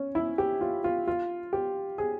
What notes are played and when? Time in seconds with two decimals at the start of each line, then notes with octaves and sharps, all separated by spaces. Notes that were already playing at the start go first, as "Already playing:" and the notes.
Already playing: C#4
0.15 E4
0.38 G4
0.61 F4
0.84 F4
1.07 F4
1.53 G4
1.98 G#4